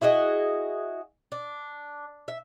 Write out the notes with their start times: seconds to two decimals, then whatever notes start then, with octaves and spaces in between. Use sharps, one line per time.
0.01 E4 F#4 G#4 D#5
1.32 D4
2.28 E5